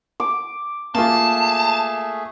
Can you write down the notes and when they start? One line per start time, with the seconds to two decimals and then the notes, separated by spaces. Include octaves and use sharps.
0.20 D6
0.95 A3 A#3 F4 G#4 A5